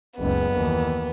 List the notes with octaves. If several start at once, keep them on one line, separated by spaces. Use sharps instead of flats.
F#1 C#2 B3
D#2 E3